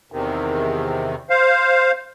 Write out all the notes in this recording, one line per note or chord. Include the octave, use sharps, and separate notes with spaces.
E2 C3 D#3
C5 F5